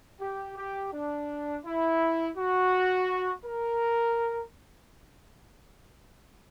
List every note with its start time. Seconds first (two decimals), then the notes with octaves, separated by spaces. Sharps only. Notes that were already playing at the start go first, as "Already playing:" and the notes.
0.21 G4
0.57 G4
0.93 D4
1.65 E4
2.37 F#4
3.45 A#4